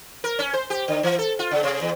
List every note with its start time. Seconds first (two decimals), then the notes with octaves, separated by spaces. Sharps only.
0.24 A#4
0.39 C#4
0.53 C5
0.70 G4
0.88 D3
1.03 E3
1.19 A4
1.39 F4
1.51 C#3
1.63 C3
1.81 E2